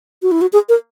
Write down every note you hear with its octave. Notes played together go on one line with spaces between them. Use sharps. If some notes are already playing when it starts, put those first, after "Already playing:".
F#4
E4
F#4
G#4
A#4